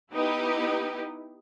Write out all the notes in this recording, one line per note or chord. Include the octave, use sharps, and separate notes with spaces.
B3 D#4 E4 G4 B4